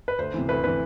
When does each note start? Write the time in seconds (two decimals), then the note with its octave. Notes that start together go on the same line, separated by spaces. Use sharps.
0.08 B4
0.18 D2 C5
0.34 C3 E3
0.48 D2 B4
0.64 C3 E3 B4